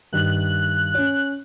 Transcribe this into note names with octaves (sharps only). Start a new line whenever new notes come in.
G2 D#3 F#6
C#4 C#5